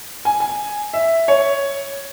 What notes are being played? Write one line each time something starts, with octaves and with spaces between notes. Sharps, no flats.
G#5
G#5
E5
C#5